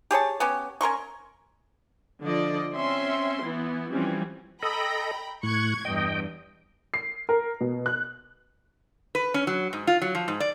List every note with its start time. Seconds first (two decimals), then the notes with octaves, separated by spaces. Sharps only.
0.11 G4 G#4 C#5 A5
0.40 B3 C#4 G4
0.81 C#4 A#4 C6 C#6
2.22 D3 F3 D5 D#5
2.73 C4 C#4 E5 C6
3.41 E3 B3 E4
3.91 E3 F3 G3 C4 C#4
4.63 A4 D#5 G5 A#5 B5
5.43 A2 C#6 F#6 G#6
5.85 E2 G2 D#5 G5
6.94 C7
7.29 A#4
7.61 B2
7.86 F#6
9.15 B4
9.34 C#4
9.47 F#3
9.73 G#2
9.87 F4
10.02 F#3
10.15 F3
10.28 G#2
10.40 D5